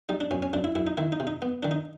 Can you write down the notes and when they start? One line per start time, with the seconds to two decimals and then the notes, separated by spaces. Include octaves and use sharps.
0.09 G3 D#4
0.20 D4
0.31 F#2 C#4
0.42 C#4
0.53 F#2 D4
0.64 E4
0.75 F#2 E4
0.87 D#4
0.97 D#3 E4
1.12 D#4
1.20 C3
1.27 D#4
1.42 B3
1.63 D#3 D4
1.71 D#4